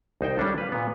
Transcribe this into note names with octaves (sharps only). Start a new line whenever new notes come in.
C2 D#4 C5 G5
G3 C#4 D4 A4
B4 F5
A#2 B3